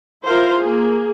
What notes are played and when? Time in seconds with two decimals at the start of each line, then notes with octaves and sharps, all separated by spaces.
0.24 E4 F4 A#4 C5 F5
0.59 A#3 G#4